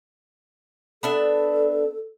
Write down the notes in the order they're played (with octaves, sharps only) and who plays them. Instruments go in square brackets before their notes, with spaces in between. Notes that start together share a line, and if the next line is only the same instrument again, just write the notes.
[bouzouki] B3 D4 E5 [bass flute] A4